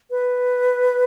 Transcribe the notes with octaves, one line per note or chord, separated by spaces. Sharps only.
B4